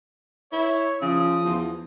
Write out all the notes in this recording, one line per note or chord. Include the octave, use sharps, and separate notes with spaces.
E4 C#5
C#3 F3 D#6
E2